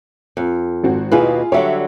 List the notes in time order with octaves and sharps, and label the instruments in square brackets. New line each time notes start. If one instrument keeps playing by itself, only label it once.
[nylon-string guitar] F2
[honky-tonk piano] G#1 C4 F#4
[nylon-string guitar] D#2 B2 B4 [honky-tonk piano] E4 F4 G#4
[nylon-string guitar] D3 F#3 G3 [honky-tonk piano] C#5 E5